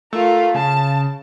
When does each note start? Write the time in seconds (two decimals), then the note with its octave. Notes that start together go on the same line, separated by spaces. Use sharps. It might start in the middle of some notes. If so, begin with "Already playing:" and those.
0.13 A3 F4 A#4
0.54 C#3 A5